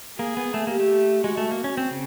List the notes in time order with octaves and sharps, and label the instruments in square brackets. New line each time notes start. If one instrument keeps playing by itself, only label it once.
[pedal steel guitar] A#3 [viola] G#4
[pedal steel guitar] B3
A3
[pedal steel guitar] A#3 [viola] G4
[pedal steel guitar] A3
[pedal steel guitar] G#3 [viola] F#4
[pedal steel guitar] A3
A#3
C#4
C4
C#3